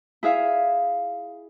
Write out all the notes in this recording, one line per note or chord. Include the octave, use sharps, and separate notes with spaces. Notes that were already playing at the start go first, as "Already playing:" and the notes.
E4 G#4 E5 F5